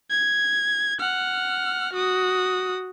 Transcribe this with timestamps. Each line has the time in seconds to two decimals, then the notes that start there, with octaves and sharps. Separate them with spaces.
0.10 G#6
1.00 F#5 F6
1.93 F#4 D#6